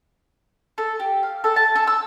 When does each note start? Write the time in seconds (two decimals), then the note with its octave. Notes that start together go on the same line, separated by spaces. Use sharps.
0.78 A4
1.00 G4
1.23 F5
1.44 A4
1.56 A5
1.75 A4
1.87 E6